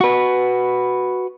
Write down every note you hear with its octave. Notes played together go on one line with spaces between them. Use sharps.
F#4 B4